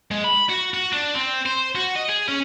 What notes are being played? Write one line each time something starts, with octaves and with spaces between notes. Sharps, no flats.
G#3
B5
F#4
F#4
D4
C4
C5
F#4
D#5
G#4
C#4